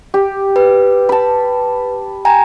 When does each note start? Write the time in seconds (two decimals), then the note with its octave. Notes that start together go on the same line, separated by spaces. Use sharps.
0.14 G4
0.56 B4
1.09 A5 B5
2.25 G5 G#5 A#5